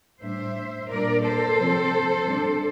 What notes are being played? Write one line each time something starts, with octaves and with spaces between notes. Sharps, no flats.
A2 G3 D4 C5 E5
A#2 G3 D4 A#4 D5
A4 C5
C3 F3 C4
C3 G3 D4